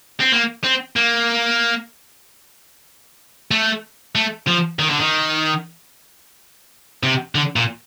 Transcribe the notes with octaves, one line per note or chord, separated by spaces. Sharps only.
C4
A#3
C4
A#3
A3
A3
F3
D#3
D3
D#3
C3
D3
A#2